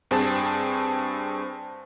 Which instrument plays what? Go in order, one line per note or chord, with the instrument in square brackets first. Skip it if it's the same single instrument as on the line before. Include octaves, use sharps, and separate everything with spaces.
[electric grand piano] G2 C4 G#4 A5